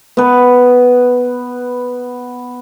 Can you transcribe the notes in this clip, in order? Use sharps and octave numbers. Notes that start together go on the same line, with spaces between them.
B3 B4